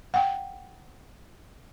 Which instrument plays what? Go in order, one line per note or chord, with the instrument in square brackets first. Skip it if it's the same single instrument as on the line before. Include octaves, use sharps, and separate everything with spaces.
[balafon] F#5 G5